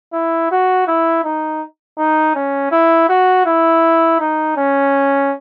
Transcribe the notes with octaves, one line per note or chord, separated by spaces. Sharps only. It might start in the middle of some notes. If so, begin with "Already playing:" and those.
E4
F#4
E4
D#4
D#4
C#4
E4
F#4
E4
D#4
C#4